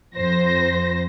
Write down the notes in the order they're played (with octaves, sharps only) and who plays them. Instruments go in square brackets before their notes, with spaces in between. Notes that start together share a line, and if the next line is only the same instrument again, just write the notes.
[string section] F2 C5 A#6